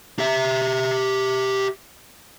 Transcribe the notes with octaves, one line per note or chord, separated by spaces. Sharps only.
G4 E5